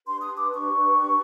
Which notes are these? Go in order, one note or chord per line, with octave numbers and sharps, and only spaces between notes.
D4 G4 B4 C6
D#6
D6
C#6